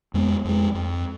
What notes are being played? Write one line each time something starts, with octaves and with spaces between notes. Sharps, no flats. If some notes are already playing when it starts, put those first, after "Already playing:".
F2 G#3 A3 B3
F2 G#3
F2